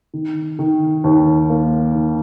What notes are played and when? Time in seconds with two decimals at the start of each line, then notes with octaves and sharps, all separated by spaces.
0.14 D#3
0.59 D#3
1.04 D#2
1.50 A#3
1.95 D#3